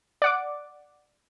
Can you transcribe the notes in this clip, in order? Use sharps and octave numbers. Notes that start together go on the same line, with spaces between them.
D5 F#5 D6